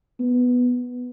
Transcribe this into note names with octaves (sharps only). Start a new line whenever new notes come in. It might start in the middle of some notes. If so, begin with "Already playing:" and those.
B3